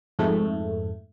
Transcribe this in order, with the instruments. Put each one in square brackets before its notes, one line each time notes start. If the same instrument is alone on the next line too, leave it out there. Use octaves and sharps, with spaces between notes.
[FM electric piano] F2 G#2 A3